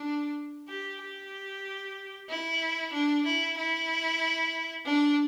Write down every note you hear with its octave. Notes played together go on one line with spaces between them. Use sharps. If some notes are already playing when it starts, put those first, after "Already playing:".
Already playing: D4
G4
G4
E4
D4
E4
E4
D4